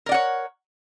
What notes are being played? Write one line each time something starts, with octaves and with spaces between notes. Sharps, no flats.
A#4 C#5 D5 F#5